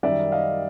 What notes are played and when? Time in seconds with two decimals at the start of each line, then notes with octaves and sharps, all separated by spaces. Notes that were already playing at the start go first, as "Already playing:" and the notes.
0.03 F#2 D#3 G3 D5 E5
0.32 D#5 F5